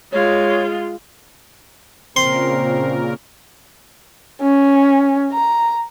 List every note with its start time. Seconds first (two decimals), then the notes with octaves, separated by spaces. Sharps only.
0.12 G#3 F4 C#5
2.16 A#2 C#3 C4 A#4 C6
4.41 C#4
5.32 A#5